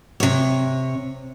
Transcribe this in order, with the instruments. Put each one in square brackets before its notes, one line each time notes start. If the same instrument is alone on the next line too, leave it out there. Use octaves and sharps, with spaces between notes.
[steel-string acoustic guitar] C3 C#5